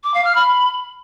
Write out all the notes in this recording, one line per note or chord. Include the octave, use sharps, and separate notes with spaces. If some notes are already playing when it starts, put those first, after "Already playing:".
D6
F5
F6
B5